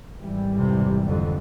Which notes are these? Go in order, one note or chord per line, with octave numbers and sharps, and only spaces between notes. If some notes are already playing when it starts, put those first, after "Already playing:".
G#1 E3 G3
F2 C3
F2 D3